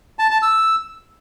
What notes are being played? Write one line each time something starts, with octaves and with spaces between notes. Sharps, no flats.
A5
A5
E6